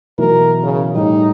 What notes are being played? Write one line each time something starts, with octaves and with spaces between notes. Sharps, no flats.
B2 E3 F#3 A#4
C#3
A2 G3 D#4